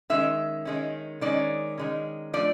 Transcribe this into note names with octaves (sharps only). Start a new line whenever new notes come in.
D#3 G#3 C#4 E5
D#3 G#3 C#4
D#3 G#3 C#4 D5
D#3 G#3 C#4
F3 A3 D4 D5